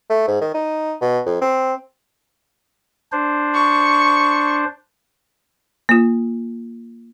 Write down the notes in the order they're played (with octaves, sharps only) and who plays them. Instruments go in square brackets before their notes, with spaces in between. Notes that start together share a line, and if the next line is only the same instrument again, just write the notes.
[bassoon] A3
G#2
D#3
D#4
B2
F2
C4
[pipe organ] D4 C5
[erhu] C#6
[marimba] A#3 F4